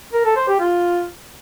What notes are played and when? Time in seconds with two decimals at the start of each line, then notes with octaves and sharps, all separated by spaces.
0.13 A#4
0.25 A4
0.37 C5
0.48 G4
0.60 F4